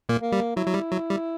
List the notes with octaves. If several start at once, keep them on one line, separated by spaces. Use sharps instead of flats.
A#2 A#3
A#3
G3
F#3 E4
F#3
G3
F#3
G3